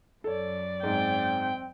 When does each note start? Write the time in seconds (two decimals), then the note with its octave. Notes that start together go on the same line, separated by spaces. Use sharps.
0.24 F#2 A4 C#5 D5
0.83 G#2 C4 G5